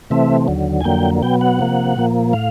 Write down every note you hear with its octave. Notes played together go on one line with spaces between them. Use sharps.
C3 E3 A3 C4 E5
D#2 D3 F#3
G#5
F2 D3 F#3 A#3 G5
B2 F#3 B3 G5
F#5
C3 F3 A#3
A#2 F3 A#3
A2 F5